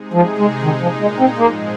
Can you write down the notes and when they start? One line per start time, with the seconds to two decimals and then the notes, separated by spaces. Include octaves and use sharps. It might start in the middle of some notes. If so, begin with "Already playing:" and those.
Already playing: C3 G#3 D#4 G#4
0.14 F3
0.39 G#3
0.63 A#2 D#3 G#3 D#4
0.82 F3
1.01 G#3
1.20 C4
1.39 G#2 F3 G#3 A#3 C4 G#4